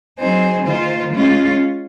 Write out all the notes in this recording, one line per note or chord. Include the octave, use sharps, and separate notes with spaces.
F#3 C4 D#4 G#4 C5
D#3 A#3 F4 C5
G#3 C#4 F4